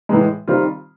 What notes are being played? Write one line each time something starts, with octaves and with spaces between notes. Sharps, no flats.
A2 E3 G#3
D#3 G3 C4 F4